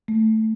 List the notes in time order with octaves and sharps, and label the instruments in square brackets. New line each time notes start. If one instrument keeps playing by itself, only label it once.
[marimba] A3